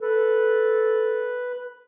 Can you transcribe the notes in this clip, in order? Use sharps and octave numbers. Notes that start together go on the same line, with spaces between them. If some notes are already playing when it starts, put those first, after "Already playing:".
A4 B4